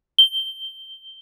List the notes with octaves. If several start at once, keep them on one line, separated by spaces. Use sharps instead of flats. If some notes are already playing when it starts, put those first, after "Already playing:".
G7